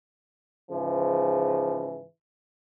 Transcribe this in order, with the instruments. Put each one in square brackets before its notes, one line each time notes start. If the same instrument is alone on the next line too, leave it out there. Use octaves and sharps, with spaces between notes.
[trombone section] G#2 C#3 E3 F3